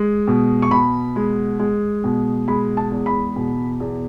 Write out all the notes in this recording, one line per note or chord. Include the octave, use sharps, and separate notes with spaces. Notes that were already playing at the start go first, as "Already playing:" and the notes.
Already playing: G#3
B2
C#6
B2 B5
G#3
G#3
B2
G#3 B5
A5
E2
B5
B2
E2